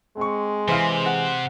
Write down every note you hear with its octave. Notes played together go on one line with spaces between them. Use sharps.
G#3 C4 C#6
C3 E3 G#4 C5 F5
F#5